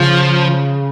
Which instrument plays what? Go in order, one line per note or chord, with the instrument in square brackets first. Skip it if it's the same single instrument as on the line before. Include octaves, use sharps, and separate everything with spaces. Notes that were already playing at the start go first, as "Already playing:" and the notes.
Already playing: [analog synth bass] C#3 [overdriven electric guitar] F3